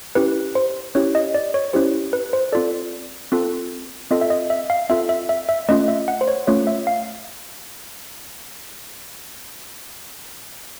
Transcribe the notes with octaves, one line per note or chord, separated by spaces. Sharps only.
C#4 E4 G4 B4
C5
C#4 E4 G4 C#5
D#5
D5
C#5
C#4 E4 G4 C5
B4
C5
C4 F4 A4 D5
C4 F4 A4
C4 F4 A4 D#5
E5
D#5
E5
F5
C4 F4 A4 E5
E5
E5
E5
A3 C#4 F4 D#5
E5
F#5
C5
C#5
A3 C#4 F4 C#5
E5
F5